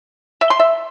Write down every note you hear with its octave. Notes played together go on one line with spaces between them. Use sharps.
E5
C6
E5